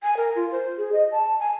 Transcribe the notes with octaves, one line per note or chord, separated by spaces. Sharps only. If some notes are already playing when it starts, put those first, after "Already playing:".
G#5
A#4
F4
C5
G#4
D#5
A5
G#5